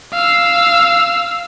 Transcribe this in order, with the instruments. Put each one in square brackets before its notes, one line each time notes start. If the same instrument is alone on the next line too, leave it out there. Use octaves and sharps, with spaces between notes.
[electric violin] F5 E6